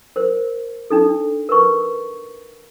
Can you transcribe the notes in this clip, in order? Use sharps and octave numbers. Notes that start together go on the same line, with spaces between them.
A#4 C5
D4 D#4 A4
A#4 B4 C#6